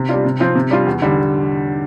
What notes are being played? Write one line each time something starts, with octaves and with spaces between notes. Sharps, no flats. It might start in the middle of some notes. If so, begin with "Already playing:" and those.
Already playing: C3
G3 D4 F4
C3
F3 C4 F4
C3
G3 D4 F4
E2
D3 G3